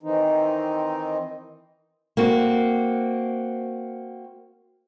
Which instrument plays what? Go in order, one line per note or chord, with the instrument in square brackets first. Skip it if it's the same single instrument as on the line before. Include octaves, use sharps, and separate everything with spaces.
[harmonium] D#3 E3 C4 D#4
[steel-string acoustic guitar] A#3 C4 F#4